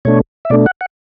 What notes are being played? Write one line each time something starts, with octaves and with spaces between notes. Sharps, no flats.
B2 A3 D4 C#5
E5
B2 A3 D4 D5
F#5
F#5